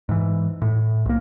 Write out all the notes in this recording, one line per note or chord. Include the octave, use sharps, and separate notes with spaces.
G#2 E3
A2
B1 A#3